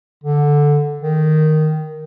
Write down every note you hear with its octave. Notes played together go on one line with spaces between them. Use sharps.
D3
D#3